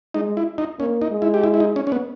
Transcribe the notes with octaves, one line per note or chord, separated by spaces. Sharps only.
G#3 D#4
E4
D#4
A#3 C#4
D#4
G#3
E4
G4
E4
E4
D#4
C#4
C#4
B3